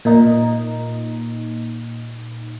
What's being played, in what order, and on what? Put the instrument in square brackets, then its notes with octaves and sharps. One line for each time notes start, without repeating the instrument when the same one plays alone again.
[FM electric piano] A#2 D#4